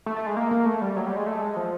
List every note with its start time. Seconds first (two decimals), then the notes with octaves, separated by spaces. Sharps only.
0.06 A3
0.16 A3
0.26 G#3
0.37 A#3
0.51 A#3
0.66 A3
0.82 G3
0.96 F#3
1.06 G3
1.16 G#3
1.27 A3
1.41 G#3
1.56 F3